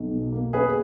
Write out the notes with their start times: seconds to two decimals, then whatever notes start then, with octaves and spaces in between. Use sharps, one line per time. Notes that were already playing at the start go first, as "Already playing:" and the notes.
Already playing: B1
0.11 B2
0.32 A#3
0.53 C#4 G#4 B4